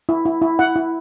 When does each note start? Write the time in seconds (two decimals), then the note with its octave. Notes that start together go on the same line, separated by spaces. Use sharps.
0.09 E4
0.25 E4
0.42 E4
0.59 E4 F#5
0.76 E4